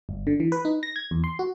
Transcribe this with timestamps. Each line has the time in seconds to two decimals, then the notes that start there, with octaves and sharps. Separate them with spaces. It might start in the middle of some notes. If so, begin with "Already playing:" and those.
0.09 G1
0.27 D3
0.40 E3
0.52 B4
0.65 D#4
0.83 A#6
0.96 G#6
1.11 E2
1.24 C6
1.39 F#4